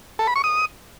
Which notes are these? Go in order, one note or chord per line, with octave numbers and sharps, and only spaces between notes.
A4
B5
C#6
D#6